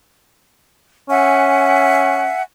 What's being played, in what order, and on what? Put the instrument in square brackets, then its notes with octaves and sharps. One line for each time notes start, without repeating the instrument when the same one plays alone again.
[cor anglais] C#4 [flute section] E5 F#5 G#5